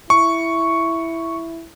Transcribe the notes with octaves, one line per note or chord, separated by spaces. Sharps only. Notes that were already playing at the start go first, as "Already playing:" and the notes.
E4 C#6